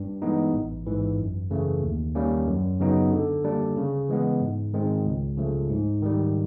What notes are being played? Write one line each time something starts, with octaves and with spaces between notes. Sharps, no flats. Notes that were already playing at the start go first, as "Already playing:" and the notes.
Already playing: G2
E3 G#3 B3 D#4
A1
G#2 E3
F#2
C#3 E3 A3
D#2
D#3 G3 A#3 C#4
F#2
C#3 F#3 B3 D#4
D3
G3 A#3 D4
C#3
E3 G#3 B3
G#2
D#3 G#3 C4
C#2
C#3 F3 A3
G#2
D#3 G3